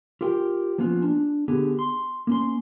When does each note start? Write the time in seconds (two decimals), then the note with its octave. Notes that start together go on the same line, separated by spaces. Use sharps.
0.21 F4 G4 A#4 G5
0.78 F3 A#3 B3 C#4 F4
1.02 D4
1.48 D3 B3 G4 G#4
1.79 C6
2.27 A#3 C#4 C6